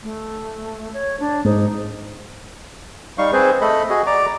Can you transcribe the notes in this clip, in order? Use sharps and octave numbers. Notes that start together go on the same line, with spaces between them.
A3
C#5
D4
G#2 D#4
G3 D#4 F5 C#6
C4 G#4 B4 C5
A3 A4 D#5 B5
F#4 G#4 D#5
D5 A#5 D6